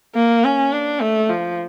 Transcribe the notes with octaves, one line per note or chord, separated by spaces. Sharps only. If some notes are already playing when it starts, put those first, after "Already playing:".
A#3
C#4
D4
A3
F3